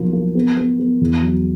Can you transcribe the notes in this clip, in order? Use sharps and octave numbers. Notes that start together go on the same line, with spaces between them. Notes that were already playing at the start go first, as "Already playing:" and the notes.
Already playing: B1 F3 A#3
A#3
B3
B3
B3
E2
F#3